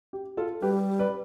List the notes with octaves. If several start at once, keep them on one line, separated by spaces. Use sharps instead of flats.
G4
F4 A4
G3 G4 B4
B4 D5